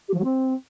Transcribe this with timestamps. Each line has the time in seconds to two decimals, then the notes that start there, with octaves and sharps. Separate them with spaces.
0.08 G4
0.13 F3
0.18 F#3
0.24 C4